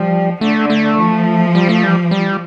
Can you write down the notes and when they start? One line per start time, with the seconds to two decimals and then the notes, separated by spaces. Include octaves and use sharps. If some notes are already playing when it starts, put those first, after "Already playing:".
Already playing: F3 G3
0.41 D3 A3
0.70 A3
0.99 F3
1.55 G3
1.69 A3
1.83 G3
2.11 G3